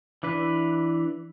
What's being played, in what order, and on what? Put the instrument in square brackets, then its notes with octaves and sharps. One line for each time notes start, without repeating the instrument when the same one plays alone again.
[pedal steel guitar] E3 D4 B4